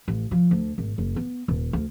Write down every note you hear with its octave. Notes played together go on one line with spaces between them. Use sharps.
A1
F3
D2
G#1
F#1
B3
D#1
D2